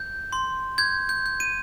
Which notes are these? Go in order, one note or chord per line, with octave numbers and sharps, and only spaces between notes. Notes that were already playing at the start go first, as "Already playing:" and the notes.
Already playing: G6
C6
G6 G#6
G6
G6
D#7